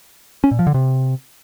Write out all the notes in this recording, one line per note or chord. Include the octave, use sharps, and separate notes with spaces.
C#4
A#2
F3
D3
C3